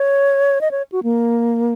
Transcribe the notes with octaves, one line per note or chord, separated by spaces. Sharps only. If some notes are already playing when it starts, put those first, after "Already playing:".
Already playing: C#5
D#5
C#5
F#4
A#3